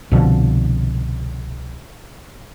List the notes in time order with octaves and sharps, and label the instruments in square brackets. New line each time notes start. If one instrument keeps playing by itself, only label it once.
[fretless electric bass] C2 B2 D3 F3